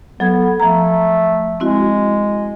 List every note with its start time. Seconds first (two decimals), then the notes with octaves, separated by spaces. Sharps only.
0.20 F#3 B3 A4 G#6
0.60 F3 A3 A#5
1.60 G#3 C4 E4 F#4